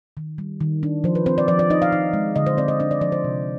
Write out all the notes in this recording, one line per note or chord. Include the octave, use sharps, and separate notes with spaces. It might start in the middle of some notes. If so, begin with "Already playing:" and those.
D#3
G3
D#3
D4
F3 C5
B4
C4 C5
D5
F3 D5
D5
D#4 D#5
F5
D#4
G#3
D3 D#5
C5
C4 D5
D#5
D4 D#5
D5
F3 D5
C5
C3